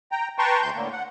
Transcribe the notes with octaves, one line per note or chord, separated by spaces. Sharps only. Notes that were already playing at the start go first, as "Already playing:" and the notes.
G5 A#5
B4 G5 A5 A#5 C6 C#6
D2 C6 G6
A2 D3 A#3
F#5